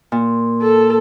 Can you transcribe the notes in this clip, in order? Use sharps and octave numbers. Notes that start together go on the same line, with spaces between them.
A#2
A4